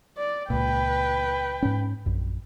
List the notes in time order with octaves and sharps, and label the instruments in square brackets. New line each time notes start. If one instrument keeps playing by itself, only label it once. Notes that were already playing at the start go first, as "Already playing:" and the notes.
[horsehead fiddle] D5
[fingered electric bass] C#2 A#2 [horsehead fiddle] B4 G5
[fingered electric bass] G#2 C#4
A#1 F#2